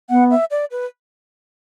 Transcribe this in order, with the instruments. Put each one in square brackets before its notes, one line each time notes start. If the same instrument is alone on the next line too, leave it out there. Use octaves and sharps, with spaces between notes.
[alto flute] B3 [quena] F#5
[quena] E5
D5
B4